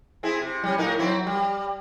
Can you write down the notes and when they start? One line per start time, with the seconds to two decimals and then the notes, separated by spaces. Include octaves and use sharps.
0.23 C4 E4 G#4
0.42 C3
0.63 G3 C#4
0.78 A2 D#4 A#4
0.99 F#3 C4 E4
1.27 G3